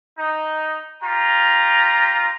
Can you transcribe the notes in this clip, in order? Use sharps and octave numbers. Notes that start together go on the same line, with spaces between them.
D#4
F4 G4 A#5